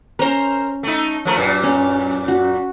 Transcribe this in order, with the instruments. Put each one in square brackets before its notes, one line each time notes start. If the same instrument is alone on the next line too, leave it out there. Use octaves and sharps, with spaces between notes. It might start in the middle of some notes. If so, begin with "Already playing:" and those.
[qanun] C#4 A#5 [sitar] A#4 C5
[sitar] A3 D#4
F3 A3 A#4
F#2 A#2
[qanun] C#4
F#4